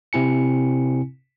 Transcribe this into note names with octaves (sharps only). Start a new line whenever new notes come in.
C3 C4 E4 G#5 C#7